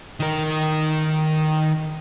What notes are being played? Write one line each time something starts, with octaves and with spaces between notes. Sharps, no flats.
D#3 A#4